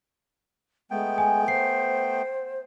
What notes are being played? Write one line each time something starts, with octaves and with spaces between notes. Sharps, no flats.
G#3 A3 B3 G5
G#5
C5 C7